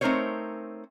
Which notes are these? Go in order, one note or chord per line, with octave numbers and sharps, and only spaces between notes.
A3 C4 D#4 A#4 C5 C#5